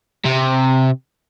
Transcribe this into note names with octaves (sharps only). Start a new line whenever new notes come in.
C3